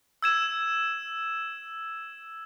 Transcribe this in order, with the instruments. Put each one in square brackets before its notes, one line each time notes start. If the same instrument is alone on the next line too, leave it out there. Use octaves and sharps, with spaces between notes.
[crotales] E6 G#6 E7